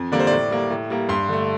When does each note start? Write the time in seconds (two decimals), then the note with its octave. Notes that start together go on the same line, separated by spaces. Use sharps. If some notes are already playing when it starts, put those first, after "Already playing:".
Already playing: F2
0.12 D3 G3 A#3 D5
0.19 C5
0.27 A2 D5
0.50 G3 A#3
0.70 A2
0.90 G3 A#3
1.09 G2 C6
1.28 D3 A3